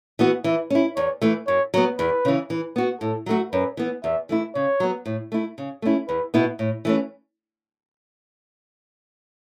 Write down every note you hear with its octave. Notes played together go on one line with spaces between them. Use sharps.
E3 B3 F#4
E3 E5
C#4 E4
E2 C#5
E3 A3
F#2 C#5
F#3 B3
E2 B4
C#3 E3
E3
B3 F#4
A2 A4
F#3 A3 F#4
F#2 B4
E3 B3
E2 E5
E3 A3 E4
C#3 C#5
F#3 B3
A2
A3 E4
C#3
A3 C#4 E4
E2 B4
B2 B3 E4
A2
E3 A3 C#4